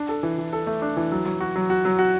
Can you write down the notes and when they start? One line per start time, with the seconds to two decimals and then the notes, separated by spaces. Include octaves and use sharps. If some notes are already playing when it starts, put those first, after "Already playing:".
Already playing: D4
0.09 A4
0.23 E3
0.38 E3
0.53 A4
0.67 A3
0.82 D4
0.97 E3
1.12 F#3
1.25 F#3
1.40 F#4
1.56 F#3
1.70 F#4
1.85 F#3
1.99 F#4